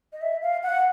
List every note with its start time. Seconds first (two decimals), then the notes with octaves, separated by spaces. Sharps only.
0.13 D#5
0.21 E5
0.42 F5
0.63 F#5